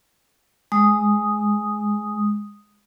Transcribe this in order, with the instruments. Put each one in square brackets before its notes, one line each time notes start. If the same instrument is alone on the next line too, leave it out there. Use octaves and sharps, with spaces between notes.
[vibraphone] G#3 D#6